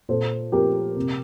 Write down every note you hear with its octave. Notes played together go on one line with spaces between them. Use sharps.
A#2 A4 C5
F3 G4 A#4
C3